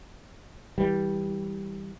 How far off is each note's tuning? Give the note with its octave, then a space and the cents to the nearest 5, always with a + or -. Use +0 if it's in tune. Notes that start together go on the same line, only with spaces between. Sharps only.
E3 -25 G3 +0